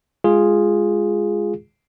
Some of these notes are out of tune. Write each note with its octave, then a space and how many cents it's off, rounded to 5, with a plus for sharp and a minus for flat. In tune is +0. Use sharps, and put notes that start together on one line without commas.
G#3 +0 F4 +0 G#4 -5